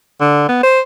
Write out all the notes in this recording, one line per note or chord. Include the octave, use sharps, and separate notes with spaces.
D3
B3
C5